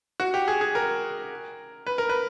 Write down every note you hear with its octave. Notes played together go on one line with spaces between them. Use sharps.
F#4
G4
G#4
G#4
A#4
B4
A#4
B4